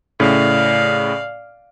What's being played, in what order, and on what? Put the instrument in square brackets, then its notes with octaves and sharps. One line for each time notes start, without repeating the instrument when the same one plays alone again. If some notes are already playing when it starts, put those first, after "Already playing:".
[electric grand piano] A2 C#3 [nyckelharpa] D5 F5